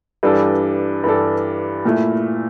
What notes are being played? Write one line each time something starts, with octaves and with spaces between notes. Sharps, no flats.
G2 E3 G3 D4 A4
G2 E3 G3 D4 A4
A#2 A3 E4